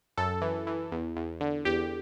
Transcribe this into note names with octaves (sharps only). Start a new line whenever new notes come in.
F#2 A4
E3
E3
E2
E2
D3
E2 G4